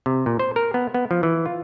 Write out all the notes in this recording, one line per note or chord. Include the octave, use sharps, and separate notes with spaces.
C3
A#2
C5
A#4
B3
B3
F3
E3
F4